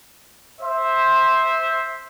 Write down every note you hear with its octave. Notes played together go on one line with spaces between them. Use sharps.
C5 E5